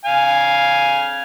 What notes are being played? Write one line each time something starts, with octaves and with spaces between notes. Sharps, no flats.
F5 G#5